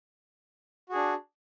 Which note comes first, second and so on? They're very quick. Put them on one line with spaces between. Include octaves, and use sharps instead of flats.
F#4 G#4 D4